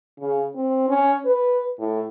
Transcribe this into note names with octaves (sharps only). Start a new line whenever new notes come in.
C#3
C4
C#4
B4
A2